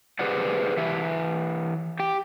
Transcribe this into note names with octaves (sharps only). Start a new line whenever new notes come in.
G4 G#4 B4 C5 D5 F#5
E3 G4 E5
G4 G5